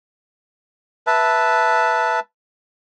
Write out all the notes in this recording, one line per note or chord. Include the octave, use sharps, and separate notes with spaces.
B4 E5 A5